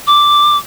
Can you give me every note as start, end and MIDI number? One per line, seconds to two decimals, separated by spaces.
0.07 0.57 86